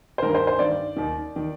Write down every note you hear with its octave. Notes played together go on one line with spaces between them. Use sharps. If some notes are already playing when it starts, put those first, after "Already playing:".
C5
G2 D#3 A#4
C5
C5
G2 D#3 D5
D#2 D#3
D#3